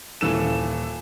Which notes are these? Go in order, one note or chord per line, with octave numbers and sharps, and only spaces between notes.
D#1 E3 A4 E7